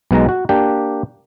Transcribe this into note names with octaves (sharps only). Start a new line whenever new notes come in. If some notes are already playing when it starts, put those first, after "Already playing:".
B1 B2 G#3 A#5
F#4
A#3 D4 G4